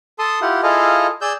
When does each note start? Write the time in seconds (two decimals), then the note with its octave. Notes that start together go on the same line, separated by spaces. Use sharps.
0.19 A4 A5 C6 D#6
0.41 E4 F4 G4 F#5
0.63 E4 F4 G#4 A4 D#5 F5
1.21 G#4 D5 E6 G6